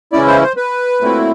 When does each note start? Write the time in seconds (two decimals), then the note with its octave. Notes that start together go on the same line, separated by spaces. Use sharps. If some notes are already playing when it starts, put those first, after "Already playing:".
0.13 C#3 E3 G#3 C#4 E4 D5
0.27 C5
0.42 C5
0.57 B4
1.00 A#2 F#3 A3 C4 E4